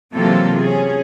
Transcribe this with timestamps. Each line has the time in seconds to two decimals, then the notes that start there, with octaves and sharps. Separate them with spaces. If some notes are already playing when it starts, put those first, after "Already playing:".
0.14 C3 E3 F#3 A#3 F4 A4
0.60 C#4 G#4